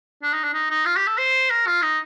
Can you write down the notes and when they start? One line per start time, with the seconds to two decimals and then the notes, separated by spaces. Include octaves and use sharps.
0.23 D4
0.33 D#4
0.44 D4
0.54 D#4
0.70 D#4
0.86 F4
0.97 G4
1.07 A4
1.18 C5
1.50 A#4
1.67 F4
1.82 D#4